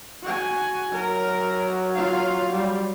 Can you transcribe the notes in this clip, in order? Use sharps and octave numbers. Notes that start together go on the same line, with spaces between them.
F#4 G#5
F#3 A#4
F4 F5
G3